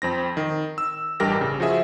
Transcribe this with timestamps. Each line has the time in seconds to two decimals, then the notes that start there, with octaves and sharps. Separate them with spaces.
0.02 F2 C4 A#6
0.37 D#3
0.78 E6
1.20 A1 G2 G4 A#4 A#6
1.41 C#3
1.60 F3 F#4 G#4 E5